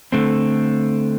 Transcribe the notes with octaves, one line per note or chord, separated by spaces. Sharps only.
D3 A3 C4